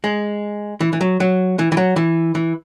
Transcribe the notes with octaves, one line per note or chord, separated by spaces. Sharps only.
G#3
E3
E3
F#3
F#3
E3
E3
F#3
E3
E3